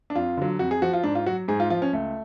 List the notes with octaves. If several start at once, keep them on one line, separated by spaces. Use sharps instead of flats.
D4
F2 F4
D3 F#3
F2 F#4
G#4
F3 F#4
F4
G#2 D4
F4
F#3 F#4
G#2 G#4
F4
F3 F4
C#4
C#2 A3